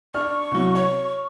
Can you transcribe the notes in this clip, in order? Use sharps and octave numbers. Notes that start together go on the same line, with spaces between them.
D4 C#6 F6
C2 F#3
C#5 C#6